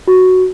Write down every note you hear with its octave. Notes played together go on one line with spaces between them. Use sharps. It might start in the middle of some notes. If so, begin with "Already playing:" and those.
F#4